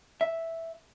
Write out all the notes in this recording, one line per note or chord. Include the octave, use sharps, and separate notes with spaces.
E5